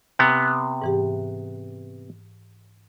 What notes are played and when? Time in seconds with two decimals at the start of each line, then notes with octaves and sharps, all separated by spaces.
0.19 C3 B3
0.82 G#2 E3 G4